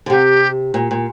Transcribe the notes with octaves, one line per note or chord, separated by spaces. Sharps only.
D3
C3 G4
A#2
A#2